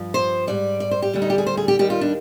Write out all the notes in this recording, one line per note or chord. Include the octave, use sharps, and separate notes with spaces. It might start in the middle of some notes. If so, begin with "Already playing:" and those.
Already playing: G2 F3
C5
G#2 G3 D5
D5
C5
G4
D2 D3 G3
D#4
G4
G#4
C5
G#4
G4
D#2 D#3 G3 G4
F4
D4